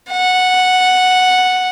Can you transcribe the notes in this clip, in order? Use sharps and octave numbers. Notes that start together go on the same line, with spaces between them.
F#5